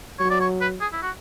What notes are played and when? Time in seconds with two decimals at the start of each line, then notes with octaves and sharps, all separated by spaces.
0.19 F#3 C#5
0.30 D5
0.40 C#5
0.61 B4
0.81 G#4
0.93 E4
1.02 F#4